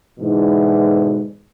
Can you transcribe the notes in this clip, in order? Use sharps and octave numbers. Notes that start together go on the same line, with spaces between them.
G#2 B2 D3 E3